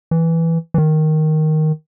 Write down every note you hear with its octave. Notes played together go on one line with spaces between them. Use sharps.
E3
E3
D#3